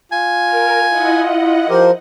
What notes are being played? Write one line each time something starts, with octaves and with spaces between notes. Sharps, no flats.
F4 G#5
A#4
E4 D#5 F#5
F3 G4 A#4 C5